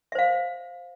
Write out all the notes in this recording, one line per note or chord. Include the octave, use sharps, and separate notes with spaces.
C5 E5 F5